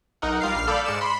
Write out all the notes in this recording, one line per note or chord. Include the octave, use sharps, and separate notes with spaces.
B1 D#4 A#4 F#5
G3 F4 A#4 F5 C7
A#1 F6 C7
A4 D5 F5 B5 G6
G#2 G#3 D5 C#7 E7
B5 C6